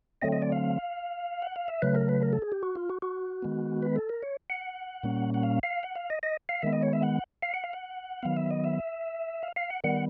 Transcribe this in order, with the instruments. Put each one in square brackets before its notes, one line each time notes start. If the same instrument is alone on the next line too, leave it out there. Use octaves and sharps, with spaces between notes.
[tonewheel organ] D3 F#3 A3 C4 D#5
D#5
D5
F5
F#5
F5
E5
C#3 F#3 A3 B4
A#4
B4
A#4
A4
G#4
G4
F#4
F4
F#4
F#4
D#3 G#3 B3
B4
A4
A#4
C#5
F#5
A#2 G3 A#3 C#4
F#5
F5
F5
F#5
F5
D#5
D#5
F5
D#3 G#3 B3 E5
D#5
C#5
E5
F#5
F5
F#5
F5
F#5
D#3 F#3 B3 F5
E5
D#5
E5
F5
F5
F#5
D#3 G3 B3 F#5